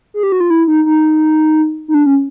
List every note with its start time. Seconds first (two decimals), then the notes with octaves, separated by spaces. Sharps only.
0.14 G#4
0.23 G4
0.32 F#4
0.40 F4
0.50 E4
0.68 D#4
0.86 D#4
1.88 D#4
1.94 D4
2.06 C#4